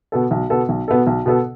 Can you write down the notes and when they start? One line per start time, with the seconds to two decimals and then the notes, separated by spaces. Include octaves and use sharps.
0.12 B2 B3 A4
0.31 B1
0.50 B2 B3 A4
0.69 B1
0.88 B2 B3 A4
1.07 B1
1.26 B2 B3 A4